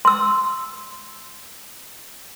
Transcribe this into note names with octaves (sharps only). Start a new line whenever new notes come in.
C6 E6